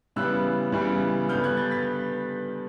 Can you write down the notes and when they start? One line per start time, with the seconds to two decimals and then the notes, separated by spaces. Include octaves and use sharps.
0.16 C#3 E3 G3 B3 E6 F#6
0.72 C#3 E3 G3 B3
1.29 G2 D3 G3 B3 F6 G6
1.44 F#6 G#6
1.57 G6 A6
1.71 A6 B6